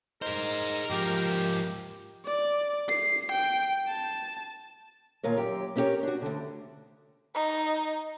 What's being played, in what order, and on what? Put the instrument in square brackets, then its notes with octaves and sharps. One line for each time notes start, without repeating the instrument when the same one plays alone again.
[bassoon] D#4 [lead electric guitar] G#4 C5 [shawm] A#4
[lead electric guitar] G#2 F3 [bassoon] A#3 [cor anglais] G4
[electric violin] D5
C7
G5
A5
[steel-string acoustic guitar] D#2 A#2 F4 A#4 C#5
F#2 G4
B3 C#4 E4 G4 A#4 C#5
D4 F#4
D2 D3
[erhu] D#4